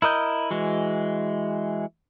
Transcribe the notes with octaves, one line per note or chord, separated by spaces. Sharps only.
E4 A#4 D#5 G6
E3 G#3 F#4